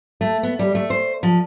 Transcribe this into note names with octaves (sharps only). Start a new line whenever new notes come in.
A3
B3
G3
A3
C5
F3